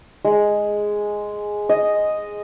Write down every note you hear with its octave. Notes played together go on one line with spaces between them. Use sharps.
G#3
D#5